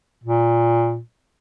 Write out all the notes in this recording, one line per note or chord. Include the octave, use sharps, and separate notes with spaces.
A#2